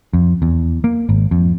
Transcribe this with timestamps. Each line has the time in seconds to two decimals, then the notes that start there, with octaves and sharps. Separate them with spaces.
0.13 F2
0.42 E2
0.84 A#3
1.09 G#1
1.31 F2